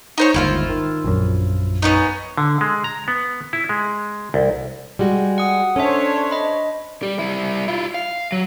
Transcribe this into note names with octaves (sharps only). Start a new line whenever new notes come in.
D#4 C5 C#5
G1 D#2 G#2 E4 F4 C5
D#3
A#1 F#2
B3 C#4 D#4
D3
G#3
A#5
B3
E4
G#3
C2
G3 G#3 F#4
F#5 D#6
C#4 D4 A4 C5 C#5 E5
D#5 B5
G3
G3 E4
E4 F4
F5
F#3